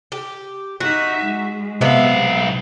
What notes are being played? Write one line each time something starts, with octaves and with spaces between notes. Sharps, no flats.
G4
D#4 F#4 E5
G#3
B1 C3 B3 E5 F5